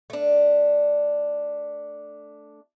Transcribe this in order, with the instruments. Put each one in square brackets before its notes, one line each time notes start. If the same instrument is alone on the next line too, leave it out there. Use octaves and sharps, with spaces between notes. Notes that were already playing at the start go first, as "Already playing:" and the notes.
[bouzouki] A3 D4